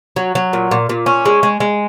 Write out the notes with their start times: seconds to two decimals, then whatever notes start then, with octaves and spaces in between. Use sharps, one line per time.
0.16 F#3
0.35 F#3
0.53 A#2
0.71 A#2
0.89 A#2
1.06 C#4
1.26 G#3
1.43 G#3
1.60 G#3